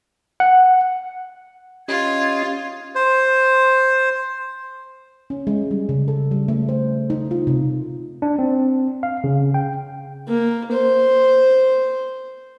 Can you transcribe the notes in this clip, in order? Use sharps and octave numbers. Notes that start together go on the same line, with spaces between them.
F#5
C#4 F4 G4 D#5 G#6
C5
C#4
G#3
G3
C#3
A4
G3
A3
C5
D#4
F4
C3
D4
C4
F5
C#3
G5
A#3
C5